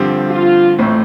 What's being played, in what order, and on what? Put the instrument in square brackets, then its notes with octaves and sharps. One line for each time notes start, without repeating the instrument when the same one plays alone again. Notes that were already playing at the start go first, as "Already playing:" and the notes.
Already playing: [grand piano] G2 D3 F3 C4 G4
[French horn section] F4
[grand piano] A1 A2 A3 C4